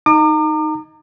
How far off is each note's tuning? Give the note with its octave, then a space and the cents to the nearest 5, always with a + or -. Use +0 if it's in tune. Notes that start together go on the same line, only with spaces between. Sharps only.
D#4 +0 A#5 -30 D6 +40